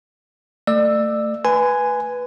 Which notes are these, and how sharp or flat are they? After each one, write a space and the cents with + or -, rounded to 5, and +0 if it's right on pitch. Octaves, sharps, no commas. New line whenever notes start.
A3 +20 D5 +35 E6 +0
B4 +0 G#5 +0 C6 -45